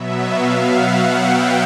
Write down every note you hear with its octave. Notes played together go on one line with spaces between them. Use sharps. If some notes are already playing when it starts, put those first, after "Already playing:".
Already playing: B2 F#3 B3 E5
F5
F#5
G5